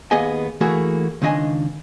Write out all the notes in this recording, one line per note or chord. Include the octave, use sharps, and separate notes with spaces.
D#2 A#3 B3 G#4 D#5 G#5
E3 A3 A#3 F#4 G#4
C#2 D#3 D4 D#5 G#5